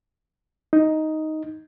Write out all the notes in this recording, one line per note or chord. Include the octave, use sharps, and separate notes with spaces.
D#4